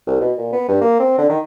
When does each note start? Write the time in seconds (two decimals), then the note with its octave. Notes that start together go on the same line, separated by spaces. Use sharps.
0.07 C2
0.21 B2
0.38 A#2
0.53 B3
0.68 G2
0.81 A#3
1.00 C4
1.18 D3
1.29 D#3